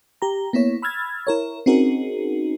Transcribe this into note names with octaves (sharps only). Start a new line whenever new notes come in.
G4 A#5
A#3 B3 E4 C#5
B5 E6 F6 G#6 A6
E4 A#4 C#5
C4 C#4 D#4 F#4 G#4 A#4